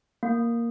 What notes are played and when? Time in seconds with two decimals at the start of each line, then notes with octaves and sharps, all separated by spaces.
0.23 A#3